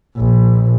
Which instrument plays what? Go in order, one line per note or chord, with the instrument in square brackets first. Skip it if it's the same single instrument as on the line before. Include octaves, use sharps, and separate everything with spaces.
[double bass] A#1